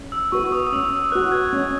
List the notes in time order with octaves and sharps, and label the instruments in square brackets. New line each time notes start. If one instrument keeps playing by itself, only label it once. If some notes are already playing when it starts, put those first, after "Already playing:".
Already playing: [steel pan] C#4
[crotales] E6
[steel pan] F#4 B4 [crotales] C#6
[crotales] D#6
D#6
[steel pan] C#4 [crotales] E6
[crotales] E6
[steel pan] F#4 B4 [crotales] F#6
[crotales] G#6
[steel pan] C#4